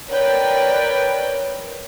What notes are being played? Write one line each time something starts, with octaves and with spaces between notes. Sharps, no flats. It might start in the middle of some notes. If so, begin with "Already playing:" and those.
A#4 B4 C#5 D5 G5